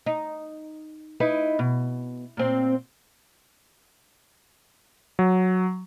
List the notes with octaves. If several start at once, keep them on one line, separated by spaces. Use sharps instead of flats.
D#4
D#4 E4 B4
B2
A#2 C4
F#3